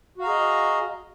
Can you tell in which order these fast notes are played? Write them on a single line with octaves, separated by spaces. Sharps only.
F#4 F5 A#5 G#4 D#5